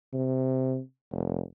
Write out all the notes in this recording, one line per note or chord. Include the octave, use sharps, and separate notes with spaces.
C3
F1